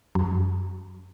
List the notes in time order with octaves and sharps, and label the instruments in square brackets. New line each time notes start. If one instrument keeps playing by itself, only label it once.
[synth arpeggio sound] F#2